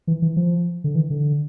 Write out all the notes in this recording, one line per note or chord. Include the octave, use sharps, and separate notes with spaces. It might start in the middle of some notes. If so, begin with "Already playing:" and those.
E3
E3
F3
D3
E3
D3